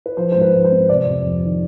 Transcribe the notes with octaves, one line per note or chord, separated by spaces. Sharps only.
B4
F3 C5
G#2 C5
B4
G#2
C5
C4
C3 D5
F2
F2
D#3